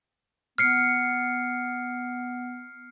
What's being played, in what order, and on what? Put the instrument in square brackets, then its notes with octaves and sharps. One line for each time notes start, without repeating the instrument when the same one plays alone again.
[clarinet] B3 [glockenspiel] F6 C7 C#7